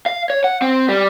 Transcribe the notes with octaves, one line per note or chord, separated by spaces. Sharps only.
F5
C#5
F#5
C4
G3